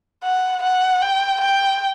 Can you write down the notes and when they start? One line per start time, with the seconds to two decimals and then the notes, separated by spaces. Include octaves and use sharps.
0.24 F#5
0.63 F#5
1.02 G5
1.41 G5